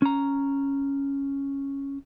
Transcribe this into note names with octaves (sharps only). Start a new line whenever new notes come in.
C#4 A#5